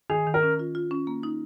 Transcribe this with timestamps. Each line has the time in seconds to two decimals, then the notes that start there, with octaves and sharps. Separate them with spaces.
0.10 D#3 G#4
0.27 D#3
0.34 A#4
0.43 C#4
0.59 F4
0.75 F4
0.91 C#4
1.07 A#3
1.23 D#4